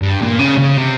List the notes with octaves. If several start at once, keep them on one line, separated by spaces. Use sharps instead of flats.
G2
A#2
C#3
C#3
C3